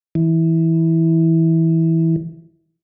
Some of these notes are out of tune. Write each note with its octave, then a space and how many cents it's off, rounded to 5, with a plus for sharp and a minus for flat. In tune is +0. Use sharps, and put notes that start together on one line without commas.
E3 -15